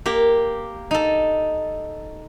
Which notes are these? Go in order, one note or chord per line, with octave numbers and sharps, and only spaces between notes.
A#3 G4 A#5
D#4 A4